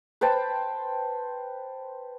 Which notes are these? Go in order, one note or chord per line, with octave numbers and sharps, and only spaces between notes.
B4 C5 G5 A5